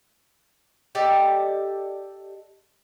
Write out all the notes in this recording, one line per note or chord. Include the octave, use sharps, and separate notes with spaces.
G4 A4 D5 D#5